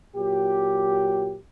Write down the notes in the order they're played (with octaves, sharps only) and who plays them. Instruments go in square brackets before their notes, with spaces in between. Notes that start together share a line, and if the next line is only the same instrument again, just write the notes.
[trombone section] A#2 F#3 G4